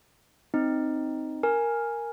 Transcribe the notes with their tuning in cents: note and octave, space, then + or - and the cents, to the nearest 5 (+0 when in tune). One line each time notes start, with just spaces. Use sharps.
C4 +0 D#4 +0
A#4 +0 G#5 +0